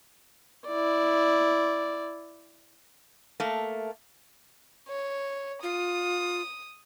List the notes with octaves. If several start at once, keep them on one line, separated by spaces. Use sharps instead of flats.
E4 D5
A3 A#3
C#5
F4 D#6